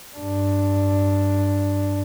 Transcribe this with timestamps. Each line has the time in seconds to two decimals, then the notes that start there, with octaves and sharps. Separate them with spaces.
0.16 G2 D4